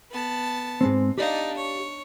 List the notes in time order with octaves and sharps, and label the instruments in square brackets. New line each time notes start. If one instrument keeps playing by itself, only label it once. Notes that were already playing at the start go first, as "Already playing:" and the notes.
[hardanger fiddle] B3 A5
[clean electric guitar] G#2 G#3 C4
[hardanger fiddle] D4 D#4 [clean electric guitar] G4 D5 F5
[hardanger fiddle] C#5